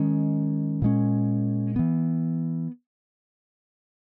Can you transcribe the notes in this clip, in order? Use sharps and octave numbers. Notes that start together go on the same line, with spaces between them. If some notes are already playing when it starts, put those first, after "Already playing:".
Already playing: D#3 G#3 C#4
A#2 G#3 C#4
E3 B3